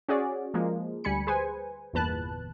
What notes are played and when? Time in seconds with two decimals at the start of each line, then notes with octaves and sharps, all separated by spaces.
0.08 C#4 F#4 G#4 D5
0.54 F3 G#3 A#3
1.04 D2 G3 G#5 B5 C#7
1.27 G#4 B4 C5 G#5
1.93 G1 E2 A#2 B4 A5 F#6